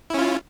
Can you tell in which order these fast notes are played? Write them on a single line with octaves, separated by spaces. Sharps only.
E4 C#4 F4